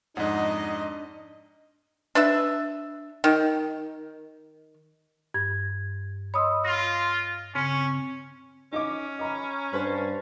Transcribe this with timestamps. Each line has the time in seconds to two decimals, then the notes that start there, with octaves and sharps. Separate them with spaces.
0.17 F2 G#2 D4 D#4 D#5 F#5
2.15 D4 B4 E5
3.24 D#3
5.34 G2 G#6
6.34 C#5 D#5 B5 C6 D#6 E6
6.65 F4 A#6
7.55 C#3 C4 C#4
8.72 C#4 D#4 D#5 D6
9.19 D#5 A#5 B5
9.73 G2 B4 C5 A5